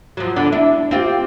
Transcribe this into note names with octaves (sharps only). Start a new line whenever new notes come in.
F3 F#3
D3 B3 D4
D4 E4
C4 F4 G4